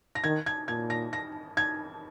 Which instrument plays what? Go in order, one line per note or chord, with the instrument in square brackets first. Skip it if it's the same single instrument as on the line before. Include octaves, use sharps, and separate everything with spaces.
[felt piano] A#6
[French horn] D#3 [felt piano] G#6
[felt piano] G#6
[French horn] A#2 [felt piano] G#6
[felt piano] A#6
A#6
G#6